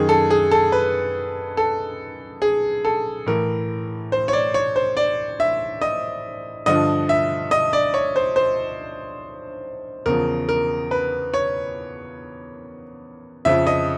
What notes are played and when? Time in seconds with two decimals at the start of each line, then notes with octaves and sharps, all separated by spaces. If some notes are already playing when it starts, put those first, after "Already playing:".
Already playing: F#2 D#3 G#4
0.09 A4
0.30 G#4
0.51 A4
0.72 B4
1.57 A4
2.42 G#4
2.85 A4
3.26 A2 E3 A#4
4.12 C5
4.28 C#5
4.33 D5
4.54 C#5
4.76 C5
4.97 D5
5.40 E5
5.81 D#5
6.66 G2 D3 F3 D#5
7.09 E5
7.51 D#5
7.73 D5
7.94 C#5
8.16 C5
8.36 C5
10.06 E2 C#3 F3 A#4
10.49 A#4
10.91 B4
11.34 C#5
13.45 F2 C#3 F3 E5
13.67 D#5